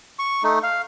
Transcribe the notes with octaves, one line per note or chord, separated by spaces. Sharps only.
C#6
A3 D#4
F5